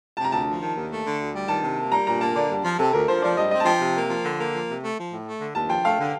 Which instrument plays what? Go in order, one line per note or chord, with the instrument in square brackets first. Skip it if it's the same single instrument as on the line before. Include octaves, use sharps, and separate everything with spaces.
[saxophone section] C3 [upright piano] A5
[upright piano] A#5
[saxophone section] D2 [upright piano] A5
[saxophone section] F3
D#3
D#2
A3
D3
D2
G3
[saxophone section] D#3 [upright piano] A5
[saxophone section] C3
A#3
[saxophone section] G3 [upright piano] A#5
[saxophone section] A#2 [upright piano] A#5
[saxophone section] A#3 [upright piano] A5
[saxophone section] D3 [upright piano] D5
[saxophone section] G2
F3
[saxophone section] C3 [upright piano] A4
[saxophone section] D2 [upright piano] A#4
[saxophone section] F3 [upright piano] C5
[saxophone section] F3 [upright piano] D5
[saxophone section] G2 [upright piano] D#5
[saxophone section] C4 [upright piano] D#5
[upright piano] A5
[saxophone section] F3 [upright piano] G5
[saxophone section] C3
A#3
F3
D3
A#3
F3
C3
A3
F3
A2
A3
D3
[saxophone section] D#2 [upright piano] A5
[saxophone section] F3 [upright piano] G5
[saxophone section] A3 [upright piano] F5
[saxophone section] D3